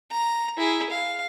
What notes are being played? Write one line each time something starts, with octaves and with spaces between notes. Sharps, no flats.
A#5
E4 G#4
F5